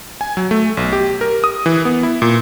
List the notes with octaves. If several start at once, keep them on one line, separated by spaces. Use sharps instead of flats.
G#5
F#3
A3
B1
G4
A#4
D#6
E3
B3
E4
A#2